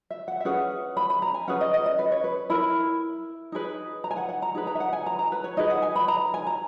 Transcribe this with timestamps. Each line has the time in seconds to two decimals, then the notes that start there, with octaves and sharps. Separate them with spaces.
0.10 E5
0.28 F#5
0.40 E5
0.45 C#4 G#4 B4 F#5
0.97 B5
1.10 B5
1.22 A#5
1.34 G#5
1.48 C#4 G#4 B4 F#5
1.61 D#5
1.74 D#5
1.86 D#5
1.99 B4
2.12 C#5
2.24 B4
2.50 E4 A#4 B5
3.52 D#4 G#4 B4
4.04 A#5
4.11 G#5
4.17 F#5
4.29 F#5
4.42 A#5
4.55 D#4 G#4 B4
4.67 A#5
4.75 E5
4.80 F#5
4.93 G#5
5.06 A#5
5.19 A#5
5.32 B4
5.44 C#5
5.57 D#4 G#4 B4 D#5
5.70 F#5
5.82 G#5
5.96 B5
6.08 A#5
6.34 G#5
6.47 A#5